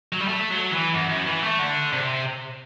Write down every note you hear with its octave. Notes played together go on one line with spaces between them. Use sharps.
F#3
G3
A3
F#3
E3
F#2
F#2
E3
A3
D3
C3